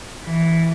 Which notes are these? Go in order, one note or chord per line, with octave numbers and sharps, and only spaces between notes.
E3